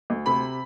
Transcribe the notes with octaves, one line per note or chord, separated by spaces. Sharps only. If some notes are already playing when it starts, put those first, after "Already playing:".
D2
C3 B5